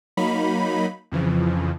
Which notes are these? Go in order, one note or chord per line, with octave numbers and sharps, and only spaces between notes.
F#3 A#3 D#4 B5
F2 C#3 E3 F3